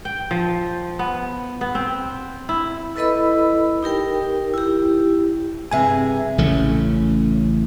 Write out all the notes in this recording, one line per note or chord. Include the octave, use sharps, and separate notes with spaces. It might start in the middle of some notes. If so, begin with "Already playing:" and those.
G5
F3
B3
B3
C4
E4
E4 A4 B4 D#5 B5 E6
D#4 G4 A#4 G5
E4 G4
G2 C3 G#4 E5 G#5
A1 C#3 A3